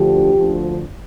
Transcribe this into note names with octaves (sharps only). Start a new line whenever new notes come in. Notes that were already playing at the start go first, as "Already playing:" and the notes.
Already playing: D2 D3 F3 G4
D2 D3 F3